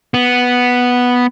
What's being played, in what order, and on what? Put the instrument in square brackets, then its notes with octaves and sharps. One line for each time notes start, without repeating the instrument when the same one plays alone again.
[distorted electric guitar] B3